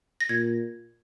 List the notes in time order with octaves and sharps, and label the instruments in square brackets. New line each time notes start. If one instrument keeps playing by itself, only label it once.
[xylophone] A#6
[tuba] A#2 [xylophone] G#6